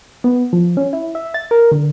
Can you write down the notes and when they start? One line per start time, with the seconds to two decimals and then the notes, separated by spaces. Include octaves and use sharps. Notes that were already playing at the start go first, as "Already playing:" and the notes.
0.24 B3
0.53 F3
0.77 C#4
0.93 E4
1.15 E5
1.34 A6
1.51 A#4
1.71 D3